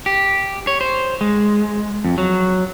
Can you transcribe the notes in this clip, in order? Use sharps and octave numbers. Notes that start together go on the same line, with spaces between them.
G4
C#5
C5
G#3
F2
F#3